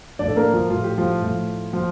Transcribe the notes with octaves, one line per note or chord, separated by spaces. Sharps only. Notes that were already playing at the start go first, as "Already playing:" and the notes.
A2 F3 D4 D5
A4
A#3 A#4
F3 F4
A2 F3 F4
G4
F3 F4
A2 F3
F3 F4